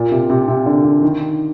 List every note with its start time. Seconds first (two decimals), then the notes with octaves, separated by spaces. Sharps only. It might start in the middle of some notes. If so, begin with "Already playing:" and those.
Already playing: A#2
0.11 C3
0.30 C3
0.48 C3
0.66 D3
0.84 D3
1.03 D#3